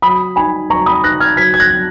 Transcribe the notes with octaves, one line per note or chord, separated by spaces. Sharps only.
F#3 B5 D#6
D#4 G#5 B5
F#3 A#5 C#6
B5 D#6
D#4 F#6 A#6
F6 G#6
F#3 G#6 B6
G#6
F#6 A#6
F#3